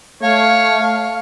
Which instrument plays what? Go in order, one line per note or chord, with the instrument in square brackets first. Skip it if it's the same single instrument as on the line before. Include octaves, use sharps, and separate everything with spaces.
[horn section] A3 [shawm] C#5 [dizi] F5